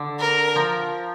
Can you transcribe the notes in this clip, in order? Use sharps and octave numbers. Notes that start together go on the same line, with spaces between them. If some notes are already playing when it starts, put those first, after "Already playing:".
Already playing: D3
A#4
F3